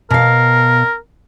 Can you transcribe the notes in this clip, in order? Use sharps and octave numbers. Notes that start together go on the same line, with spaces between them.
B2 A#4 F5